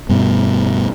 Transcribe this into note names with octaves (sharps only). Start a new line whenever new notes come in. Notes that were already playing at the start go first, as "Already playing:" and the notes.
G2 B2